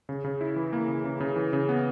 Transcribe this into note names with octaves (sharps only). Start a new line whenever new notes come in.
C#3
C#3
E4
E3
A#3
C#3
C#3
C#3
E3
C#3
B3